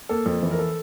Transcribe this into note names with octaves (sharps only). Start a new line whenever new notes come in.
A#3 A4
F2
E3
A#4
A4